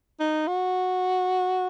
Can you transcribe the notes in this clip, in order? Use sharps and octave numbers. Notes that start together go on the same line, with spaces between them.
D#4
F#4